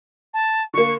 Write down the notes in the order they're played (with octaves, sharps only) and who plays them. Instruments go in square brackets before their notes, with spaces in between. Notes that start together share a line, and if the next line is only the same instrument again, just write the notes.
[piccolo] A5
[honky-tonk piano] D3 A#3 [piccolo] C#6